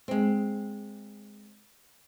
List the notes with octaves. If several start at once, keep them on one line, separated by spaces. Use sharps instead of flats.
G#3 C4